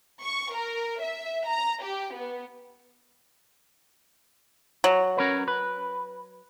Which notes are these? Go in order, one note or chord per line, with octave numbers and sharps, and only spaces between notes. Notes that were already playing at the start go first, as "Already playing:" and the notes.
C#6
A#4
E5
A#5
G4
B3
F#3
C#4 A#4 B4
B4